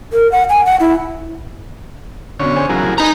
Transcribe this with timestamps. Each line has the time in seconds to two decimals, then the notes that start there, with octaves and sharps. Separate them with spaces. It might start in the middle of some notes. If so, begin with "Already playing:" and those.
0.13 A#4
0.32 F#5
0.50 G#5
0.66 F#5
0.80 E4
2.40 F#2 B2 D3 C#4 C#5
2.56 G#4 C5 G#5
2.69 G#2 C#3 E3 F#3 G#4 A#4
2.81 C2 A2
2.98 D#4 G#4 B4 G#5 A#5